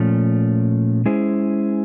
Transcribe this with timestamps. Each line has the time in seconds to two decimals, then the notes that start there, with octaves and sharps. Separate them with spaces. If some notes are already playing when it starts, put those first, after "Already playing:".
Already playing: A#2 F3 A3 C#4
1.06 G#3 C#4 E4 G#4 C5